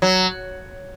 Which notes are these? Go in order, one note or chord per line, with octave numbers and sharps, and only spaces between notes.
F#3